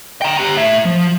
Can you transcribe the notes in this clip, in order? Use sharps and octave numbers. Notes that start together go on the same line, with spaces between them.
G5 A#5
G4 A#5
A2 E5
F3